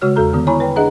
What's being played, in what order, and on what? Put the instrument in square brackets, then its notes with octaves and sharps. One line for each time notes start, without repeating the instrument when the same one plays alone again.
[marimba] C#3 G#3 F#4 C#5 F6
E2 F#4 A4 A#5 F6
D3 D#3 G3 B3
E4 C#5 G#5 A#5 B5 C#6
B4 C#5 G5
D4 G#4 D#5 E5 F#5 A#5